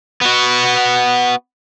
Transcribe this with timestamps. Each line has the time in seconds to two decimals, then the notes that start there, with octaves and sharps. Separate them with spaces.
0.21 B3 F#4